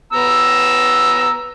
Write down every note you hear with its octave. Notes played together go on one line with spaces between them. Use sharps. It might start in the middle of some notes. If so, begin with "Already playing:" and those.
B3 A#5 E6